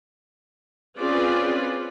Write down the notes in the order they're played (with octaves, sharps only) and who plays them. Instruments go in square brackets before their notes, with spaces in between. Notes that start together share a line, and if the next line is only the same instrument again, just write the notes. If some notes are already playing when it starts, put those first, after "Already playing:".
[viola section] C4 C#4 F4 G#4 B4 D5